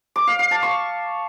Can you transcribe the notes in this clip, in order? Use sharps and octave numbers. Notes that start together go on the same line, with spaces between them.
D6
F5
F5
A5
C#6